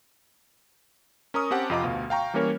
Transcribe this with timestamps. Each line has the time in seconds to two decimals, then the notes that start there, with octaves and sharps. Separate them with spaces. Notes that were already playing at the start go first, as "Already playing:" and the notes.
1.34 C#4 A#4 A#5 C#6 D#6
1.51 C4 C#4 G4 F#5 A5
1.70 F2 C3 F4 D#5 A#5 D6
1.84 D2 B2 F5
2.10 F5 G5 A#5 C#6
2.34 E3 G3 A#3 C#4 A#4 C#5